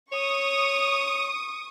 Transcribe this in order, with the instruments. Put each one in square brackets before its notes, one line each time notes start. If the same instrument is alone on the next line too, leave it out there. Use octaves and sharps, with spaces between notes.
[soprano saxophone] C#5 [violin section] C#6 D#6